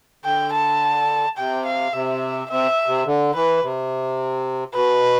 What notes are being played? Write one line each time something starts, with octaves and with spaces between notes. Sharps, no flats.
D3 G5
A5
C3 G5
F5
C3 E5
C3 E5
C3
D3
E3 B4
C3
B2 B4